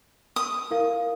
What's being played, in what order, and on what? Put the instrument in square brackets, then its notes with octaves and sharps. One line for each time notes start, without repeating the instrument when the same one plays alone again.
[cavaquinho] D#6
[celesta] E4 A#4 F5